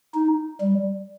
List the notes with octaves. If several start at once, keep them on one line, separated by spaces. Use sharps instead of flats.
D#4
G3